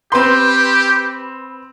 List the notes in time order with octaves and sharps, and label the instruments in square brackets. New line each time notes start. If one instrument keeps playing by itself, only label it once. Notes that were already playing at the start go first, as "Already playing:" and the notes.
[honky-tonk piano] C4 B4 C6 [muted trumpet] G4